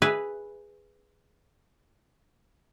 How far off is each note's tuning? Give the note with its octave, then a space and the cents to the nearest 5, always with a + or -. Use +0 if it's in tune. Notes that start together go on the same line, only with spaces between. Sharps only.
G#4 -5 B4 +0 E5 +0